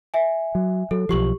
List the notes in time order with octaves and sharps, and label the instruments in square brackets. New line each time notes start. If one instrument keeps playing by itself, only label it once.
[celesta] E5 G#5
[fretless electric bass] F#3
[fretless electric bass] F#3 [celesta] A4
[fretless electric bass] B1 F3 [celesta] G4 C#6 F#7